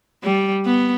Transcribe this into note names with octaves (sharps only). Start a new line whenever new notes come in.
G3
B3